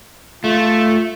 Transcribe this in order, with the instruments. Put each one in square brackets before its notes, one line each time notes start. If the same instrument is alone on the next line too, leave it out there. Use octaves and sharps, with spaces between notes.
[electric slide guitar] A3 [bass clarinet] F4